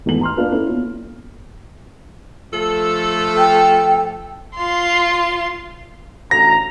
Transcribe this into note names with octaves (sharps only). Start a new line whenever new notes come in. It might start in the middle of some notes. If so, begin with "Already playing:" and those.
G#1 E2 A3 B3 F#7
A#5 C6 F6
A#3 D4 F4 B4
A#3 C#4 E4 A4
B3 F4
F3 A3 A4
G5
F4 C6
A1 D2 A#5 A#6